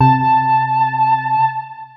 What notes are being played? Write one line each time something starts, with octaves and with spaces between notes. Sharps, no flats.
C3 A5